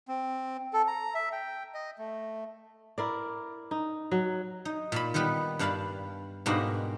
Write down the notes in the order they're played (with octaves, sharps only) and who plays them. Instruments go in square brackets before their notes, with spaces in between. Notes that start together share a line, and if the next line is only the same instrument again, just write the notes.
[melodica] C4
A4
A#5
E5
G5
D#5
A3
[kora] E4 A#4 D5
D#4
F#3
[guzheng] D#4
A#2 A5 B5
D#3 G3 B3 B4
G2 D4 F5 A5 B5
G#2 B2 G3 A#3 D4 F#4